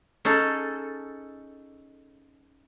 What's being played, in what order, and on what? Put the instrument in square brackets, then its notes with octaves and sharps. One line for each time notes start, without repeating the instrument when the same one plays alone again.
[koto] C#4 D#4 G#4 A4